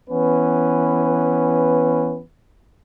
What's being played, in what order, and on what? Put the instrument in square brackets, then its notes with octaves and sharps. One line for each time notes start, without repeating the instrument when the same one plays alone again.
[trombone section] E3 B3 C#4 B4